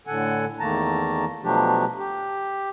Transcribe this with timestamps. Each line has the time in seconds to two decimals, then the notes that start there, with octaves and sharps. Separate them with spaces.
0.07 A2 D3 A4 F#5 G#5
0.60 E2 D#3 A3 A#3 A5 A#5
1.44 B2 F3 F#3 A3 D4 G4
1.98 G4